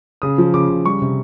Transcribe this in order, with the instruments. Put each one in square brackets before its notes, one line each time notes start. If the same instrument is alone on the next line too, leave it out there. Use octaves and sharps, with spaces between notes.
[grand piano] C#3 D#6
F3
C#3 D6
C#3
G3 C#6
C3